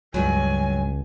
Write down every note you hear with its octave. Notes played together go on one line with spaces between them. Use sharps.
C#2 G2 F#3 G#5